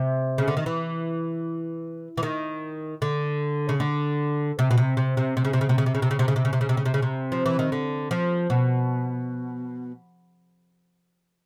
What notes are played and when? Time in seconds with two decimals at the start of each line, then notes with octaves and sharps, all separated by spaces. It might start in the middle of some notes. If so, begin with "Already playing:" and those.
Already playing: C3
0.38 C#3
0.48 D3
0.57 D#3
0.66 E3
2.17 E3
2.23 D#3
3.02 D3
3.69 C#3
3.80 D3
4.59 C3
4.71 B2
4.77 C3
4.97 C3
5.17 C3
5.37 C3
5.45 C#3
5.53 C3
5.61 C#3
5.69 C3
5.78 C#3
5.86 C3
5.95 C#3
6.02 C3
6.11 C#3
6.19 C3
6.28 C#3
6.36 C3
6.45 C#3
6.53 C3
6.61 C#3
6.69 C3
6.77 C#3
6.85 C3
6.94 C#3
7.02 C3
7.32 F3
7.46 E3
7.59 D#3
7.72 D3
8.11 F3
8.50 B2